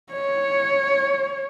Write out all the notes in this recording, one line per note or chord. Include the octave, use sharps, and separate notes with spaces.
C#5